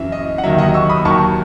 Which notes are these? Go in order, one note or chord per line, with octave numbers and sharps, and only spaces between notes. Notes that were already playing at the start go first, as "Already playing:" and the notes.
Already playing: F#2 E3 E5
D#5
F#5
D#2 D#3 F#3 E5
D#5 F#5
C#6 E6
B5 D#6
D#2 D#3 F#3 A5 C#6